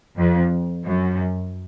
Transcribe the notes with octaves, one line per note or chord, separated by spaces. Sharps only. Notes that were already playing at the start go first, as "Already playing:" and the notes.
F2
F#2